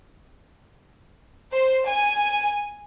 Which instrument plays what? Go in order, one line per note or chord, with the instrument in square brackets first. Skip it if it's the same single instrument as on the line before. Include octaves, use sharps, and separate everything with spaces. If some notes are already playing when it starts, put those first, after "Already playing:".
[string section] C5
G#5